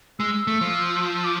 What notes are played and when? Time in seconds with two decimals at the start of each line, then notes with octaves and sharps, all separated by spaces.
0.19 G#3 E6
0.47 A3
0.61 F3
1.13 E6
1.24 D6